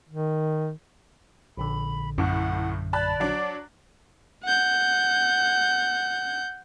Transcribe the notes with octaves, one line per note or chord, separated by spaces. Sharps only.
D#3
A#1 A#2 D3 B5
G1 F#2 A2 F#5
D5 A5 B5 F#6
F#3 D4
F#5 G6